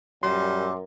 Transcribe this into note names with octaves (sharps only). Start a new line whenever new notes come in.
F#2 A#2 G3 C6